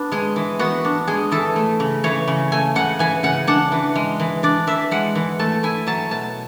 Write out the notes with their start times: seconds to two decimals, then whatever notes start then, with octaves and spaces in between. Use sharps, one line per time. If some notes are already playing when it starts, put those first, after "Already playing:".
Already playing: B3 D4 B4
0.12 G#3 G#4
0.36 E3
0.59 B3 F#4
0.85 D4
1.08 G#3 G#4
1.32 E3 A4
1.56 A3
1.80 C#3
2.04 E3 C#5
2.28 C#3
2.52 A3 G#5
2.75 C#3 F#5
2.99 E3 G#5
3.23 C#3 F#5
3.47 D4 F#5
3.72 E3
3.96 G#3
4.20 E3
4.43 D4 D5
4.67 E3 E5
4.91 G#3 F#5
5.15 E3
5.39 A3 A5
5.63 E4 G#5
5.87 F#3 A5
6.11 B2 A5